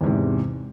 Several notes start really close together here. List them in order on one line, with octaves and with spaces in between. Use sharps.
E2 G#2 C3